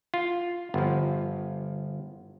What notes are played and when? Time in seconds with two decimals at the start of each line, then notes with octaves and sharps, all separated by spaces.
0.14 F4
0.74 G1 F3